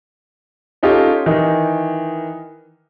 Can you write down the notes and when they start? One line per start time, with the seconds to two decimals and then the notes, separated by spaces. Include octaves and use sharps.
0.83 C#4 D#4 F4 G4 A4 C#5
1.26 D#3 E3 D#4